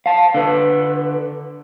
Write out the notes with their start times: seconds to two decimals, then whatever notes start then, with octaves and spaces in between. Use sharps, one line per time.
0.06 F5 A5
0.34 D3 B4